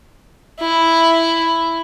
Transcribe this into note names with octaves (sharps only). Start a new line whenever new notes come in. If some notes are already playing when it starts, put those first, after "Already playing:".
E4